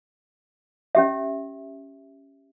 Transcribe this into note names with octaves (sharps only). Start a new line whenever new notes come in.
C#4 G4 E5